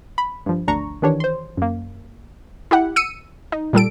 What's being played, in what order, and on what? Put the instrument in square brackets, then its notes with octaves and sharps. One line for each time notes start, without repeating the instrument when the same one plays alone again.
[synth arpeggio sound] B5
G2 F3
G#1 D2 D4 A#5 C#6
D#3 E3 D4 G4 C#5
C5 C6
F#2 A#3
E4 G4 F#5
E6 C#7 D#7
D#4
A#2 G3 A4 D7